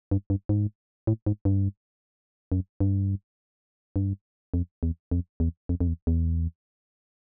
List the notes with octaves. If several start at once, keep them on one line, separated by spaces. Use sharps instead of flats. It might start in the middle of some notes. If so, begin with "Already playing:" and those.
G2
G2
G#2
A2
G#2
G2
F#2
G2
G2
F2
E2
F2
E2
F2
F2
E2
E2